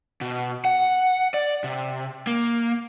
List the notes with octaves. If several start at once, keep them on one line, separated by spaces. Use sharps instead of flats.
B2
F#5
D5
C3
A#3